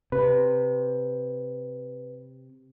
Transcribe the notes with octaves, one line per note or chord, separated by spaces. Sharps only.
C3 B4